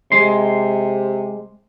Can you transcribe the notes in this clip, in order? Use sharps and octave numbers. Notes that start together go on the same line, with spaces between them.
C3 G#3 C6